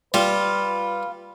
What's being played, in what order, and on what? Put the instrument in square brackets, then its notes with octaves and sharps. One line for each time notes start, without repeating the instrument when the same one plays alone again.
[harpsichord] G3 [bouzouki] F4 [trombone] B4